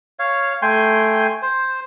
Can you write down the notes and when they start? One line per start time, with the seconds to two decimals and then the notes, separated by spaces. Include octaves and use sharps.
0.19 C#5 F5
0.62 A3 G5 G#5 C6
1.42 C5